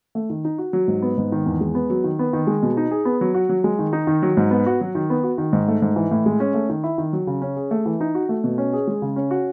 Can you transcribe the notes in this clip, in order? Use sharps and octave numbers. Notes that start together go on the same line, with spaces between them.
A3
D#3
D#4
F#4
F#3
G#2
B3
G#2
D#3
E2
G#3
B3
F#3
D#3
B3
D#3
G#3
B2
D#4
G#4
B3
F#3
F#4
F#3
G#3
D#3
D#4
D#3
F#3
G#2
B3
F#4
F#3
D#3
B3
F#4
D#3
G#2
A3
G#2
E3
A2
G#3
C#4
A3
D#3
E4
D#3
F#3
C#3
C#4
G#4
A3
E3
D#4
F#4
A3
B2
C#4
G#4
G#3
C#3
C#4
F#4